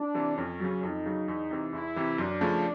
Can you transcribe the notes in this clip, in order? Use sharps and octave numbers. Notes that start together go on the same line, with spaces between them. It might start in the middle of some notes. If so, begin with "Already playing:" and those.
Already playing: D4
C3 E3
F2 C#4
C#3 F#3
F2 D#4
C#3 F#3
E2
C3 E3
E2 E4
C3 E3
F#2 D4
C#3 F3 A3 C#4